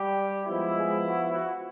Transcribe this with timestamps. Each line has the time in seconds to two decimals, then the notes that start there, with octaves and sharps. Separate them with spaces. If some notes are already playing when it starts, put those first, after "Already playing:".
Already playing: G3 G4
0.46 F3 G#3 B3 E4
0.75 G#3 G#4
1.05 F#4
1.34 F#4